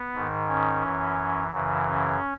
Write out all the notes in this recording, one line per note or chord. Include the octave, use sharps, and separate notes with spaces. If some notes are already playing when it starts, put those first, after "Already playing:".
Already playing: B3
G#2 D#3
C#4
F#2 E3
F#2 C#3 E3
C#4